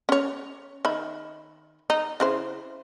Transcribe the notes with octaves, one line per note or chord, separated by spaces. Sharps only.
C#4 C#5
D#3 E5 B5
D#4
C#3 E4 C5